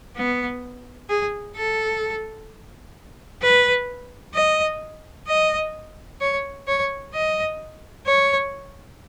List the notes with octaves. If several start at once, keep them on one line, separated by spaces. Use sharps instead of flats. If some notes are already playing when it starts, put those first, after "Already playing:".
B3
G#4
A4
B4
D#5
D#5
C#5
C#5
D#5
C#5